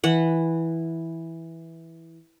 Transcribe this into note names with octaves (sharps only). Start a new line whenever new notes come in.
E3 F#5